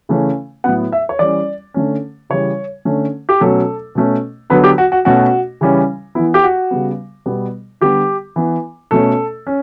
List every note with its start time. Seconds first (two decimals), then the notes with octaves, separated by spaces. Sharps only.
0.09 C#3 E3 A3 C#4
0.64 A2 F#3 B3 F#5
0.92 E5
1.09 C#5
1.19 E3 G3 C#4 D5
1.74 D3 A3 C#4
2.30 C#3 E3 G3 C#5
2.85 D3 A3 C#4
3.29 G4
3.41 B2 F#3 A3 C#4 A4
3.95 B2 A3 C#4
4.50 D3 F#3 B3 B4
4.64 G4
4.78 F#4
4.92 F#4
5.05 B2 A3 C#4 F#4
5.61 C#3 E3 G3 C#4
6.15 B3 E4
6.19 E3
6.34 G4
6.43 F#4
6.71 C#3 G3 B3
7.26 B2 G3 B3
7.81 D3 G3 B3 G4
8.36 E3 B3
8.91 B2 A3 C#4 A4
9.47 C#4